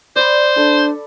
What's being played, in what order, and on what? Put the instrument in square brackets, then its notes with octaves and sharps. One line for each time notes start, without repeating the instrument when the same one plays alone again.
[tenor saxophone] C5 [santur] D5 B5
[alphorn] D4 [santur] A4